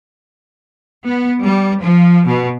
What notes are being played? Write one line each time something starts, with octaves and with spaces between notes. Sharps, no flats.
B3
G3
F3
B2